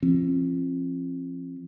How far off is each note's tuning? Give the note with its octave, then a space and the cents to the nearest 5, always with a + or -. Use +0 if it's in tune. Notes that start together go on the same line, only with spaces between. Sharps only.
F3 -30 C4 +40